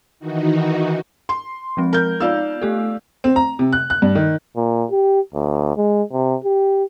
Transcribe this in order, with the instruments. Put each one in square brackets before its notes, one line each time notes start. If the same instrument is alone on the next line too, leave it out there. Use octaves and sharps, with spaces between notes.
[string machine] D#3 E3 D#4 F#4
[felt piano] C6
[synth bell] F3 G#3 C4
[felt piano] A#4 G6
[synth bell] B3 D#4 F4 [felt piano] D5 F5 E6
[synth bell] A3 G4 A4
[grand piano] C4
A#5
C3
F#6
F#6
G2
D#3
[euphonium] A#2
G4
D2
G#3
C3
G4